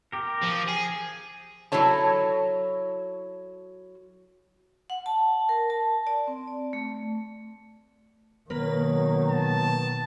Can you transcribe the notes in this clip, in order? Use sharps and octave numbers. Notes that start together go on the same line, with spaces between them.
G4 A#4
F3
G#4
F#3 E4 A4 C#5 A5
F#5
A5
A#4
A5
D5
C4
D5
A3
B2 D#3 F#3 A#3 B4
A5